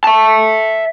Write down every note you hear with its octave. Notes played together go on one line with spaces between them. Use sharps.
E5 A5